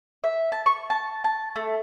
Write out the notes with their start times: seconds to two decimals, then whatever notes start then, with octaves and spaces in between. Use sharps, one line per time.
0.24 E5
0.52 A5
0.66 C#6
0.90 A5
1.24 A5
1.56 A3